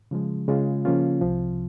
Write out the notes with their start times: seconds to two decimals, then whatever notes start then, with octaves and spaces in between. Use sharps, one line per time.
0.11 C#3 F3 G#3
0.48 C#3 G#3 C#4 F4
0.85 C#3 F3 A#3 C#4 F4
1.21 C2 C3 F3